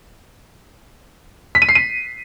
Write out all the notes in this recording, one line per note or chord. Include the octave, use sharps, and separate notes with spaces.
B6
D#7
C7
D#7